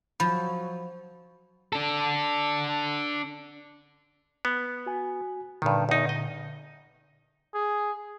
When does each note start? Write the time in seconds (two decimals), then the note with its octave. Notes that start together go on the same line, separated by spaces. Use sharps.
0.20 F3 F#3 B5
1.73 D4 A4
4.45 B3
4.86 F#4 G#5
5.62 G2 A#2 D3 D#3
5.89 E2 D#4
6.09 D#5
7.54 G#4